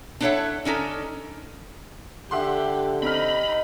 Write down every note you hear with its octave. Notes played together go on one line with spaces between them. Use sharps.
D4 E4 A4 C#5 E5 F#5
D3 C#4 D#4 A4
D3 G4 E5 F#5 C6
C4 D#4 B5 F6